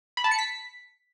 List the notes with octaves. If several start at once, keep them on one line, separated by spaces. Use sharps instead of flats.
B5
A5
C#7
B6